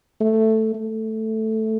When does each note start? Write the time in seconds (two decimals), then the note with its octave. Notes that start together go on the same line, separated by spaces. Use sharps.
0.21 A3
0.74 A3